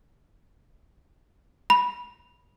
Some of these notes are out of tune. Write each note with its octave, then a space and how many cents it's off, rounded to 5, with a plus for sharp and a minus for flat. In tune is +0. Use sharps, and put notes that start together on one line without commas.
B5 -15